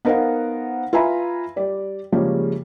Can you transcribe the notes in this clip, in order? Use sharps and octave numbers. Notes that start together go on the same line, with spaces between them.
B3 D#4 A#4 C5 F5 F#5
F4 B4 E5 G#5 A#5 B5
G3 D5
C#3 F3 G3 G#3 A#3 C#4